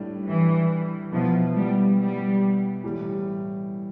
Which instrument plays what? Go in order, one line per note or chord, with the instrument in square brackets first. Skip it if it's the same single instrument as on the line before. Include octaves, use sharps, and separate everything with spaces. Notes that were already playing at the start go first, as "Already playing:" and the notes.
Already playing: [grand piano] A2 G3 D4
[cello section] E3
[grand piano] B2 B3 E4 [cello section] F3
[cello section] G3
G3
[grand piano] A2 E3 G3